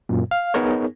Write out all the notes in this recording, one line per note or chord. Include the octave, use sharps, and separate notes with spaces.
F#2 A#2
F5
B3 D#4 G#4 A#4 C#5